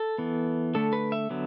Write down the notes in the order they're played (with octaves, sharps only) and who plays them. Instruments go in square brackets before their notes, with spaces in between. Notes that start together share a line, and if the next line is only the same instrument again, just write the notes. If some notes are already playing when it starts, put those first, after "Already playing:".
Already playing: [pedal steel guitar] A4
E3 B3
D3 A3 A4
B4
E5
D3 F#3 B3